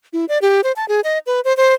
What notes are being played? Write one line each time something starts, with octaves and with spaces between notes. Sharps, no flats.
E4
D5
G4
C5
A5
G#4
D#5
B4
C5
C5